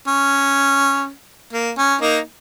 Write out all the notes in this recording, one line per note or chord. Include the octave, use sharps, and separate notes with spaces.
C#4
A#3
C#4
A#3 D#4